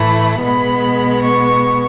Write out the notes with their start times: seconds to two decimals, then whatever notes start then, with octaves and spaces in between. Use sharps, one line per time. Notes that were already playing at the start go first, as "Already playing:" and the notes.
Already playing: A2 E3 A3 B5
0.43 B2 G#3 B3 B5
1.22 C#6